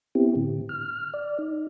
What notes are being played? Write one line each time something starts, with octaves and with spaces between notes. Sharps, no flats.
B3 C4 E4 G4
A2 D3
F6
D5
D#4